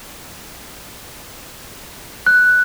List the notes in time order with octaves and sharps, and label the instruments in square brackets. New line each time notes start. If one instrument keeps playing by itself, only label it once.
[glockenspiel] F#6